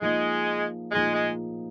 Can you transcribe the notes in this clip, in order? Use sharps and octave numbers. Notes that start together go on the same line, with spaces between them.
F3 G#3 A#3 D#4 G#4
F3 G#3 A#3 D#4 G#4
G#3